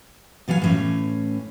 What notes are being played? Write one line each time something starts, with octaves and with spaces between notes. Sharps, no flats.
B2 E3 F#3 F5 G#5
A2 E3 C#4